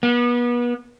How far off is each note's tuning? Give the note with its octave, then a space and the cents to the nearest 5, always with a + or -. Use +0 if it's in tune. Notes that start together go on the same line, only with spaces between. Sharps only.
B3 -35